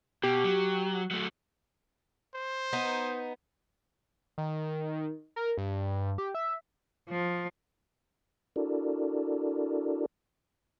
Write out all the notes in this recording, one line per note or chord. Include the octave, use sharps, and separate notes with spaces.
B2 G4
F#3
F#3 A3
C5
B3 D#4
D#3
A#4
G2
G4
E5
F3
D4 E4 F#4 A4 A#4 D5